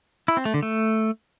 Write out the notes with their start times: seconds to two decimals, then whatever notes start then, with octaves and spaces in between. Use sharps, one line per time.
0.28 E4
0.37 C4
0.45 A3
0.54 D3
0.63 A3